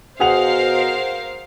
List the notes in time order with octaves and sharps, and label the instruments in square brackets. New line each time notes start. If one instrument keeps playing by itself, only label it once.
[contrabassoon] B2 [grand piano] G#4 F#5 F7 [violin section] A#4 C5 F5